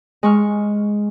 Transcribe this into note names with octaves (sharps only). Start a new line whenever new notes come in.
G#3 C#6 F6